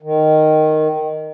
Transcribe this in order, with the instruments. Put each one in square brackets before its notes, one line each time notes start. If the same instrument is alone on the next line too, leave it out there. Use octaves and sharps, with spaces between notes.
[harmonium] D#3